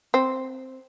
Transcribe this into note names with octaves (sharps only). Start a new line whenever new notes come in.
C4